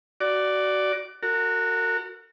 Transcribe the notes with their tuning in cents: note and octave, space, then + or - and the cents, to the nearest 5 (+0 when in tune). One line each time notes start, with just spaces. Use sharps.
F#4 +25 D5 +0
F#4 -5 A#4 -40